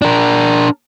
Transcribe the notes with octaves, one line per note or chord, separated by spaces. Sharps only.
D4 A#4